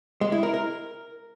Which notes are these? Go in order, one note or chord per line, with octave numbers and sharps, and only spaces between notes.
G#3
E4
A#4
A#4